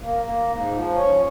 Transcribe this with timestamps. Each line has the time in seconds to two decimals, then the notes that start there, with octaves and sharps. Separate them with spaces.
0.02 A#3
0.25 A#3
0.48 G#2
0.71 F3
0.94 C#4